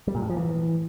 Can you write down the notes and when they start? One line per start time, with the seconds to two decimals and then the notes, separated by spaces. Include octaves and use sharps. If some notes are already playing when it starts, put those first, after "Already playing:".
0.07 G3
0.15 A#2
0.22 A2
0.30 F3
0.37 E3